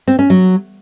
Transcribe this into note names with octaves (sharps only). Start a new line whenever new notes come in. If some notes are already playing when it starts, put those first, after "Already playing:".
C4
C#4
F#3